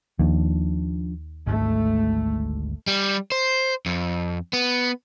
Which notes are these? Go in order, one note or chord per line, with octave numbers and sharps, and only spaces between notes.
D#2 F3 D4
G#1 D2 G#2 A3
G3
C5
F2
B3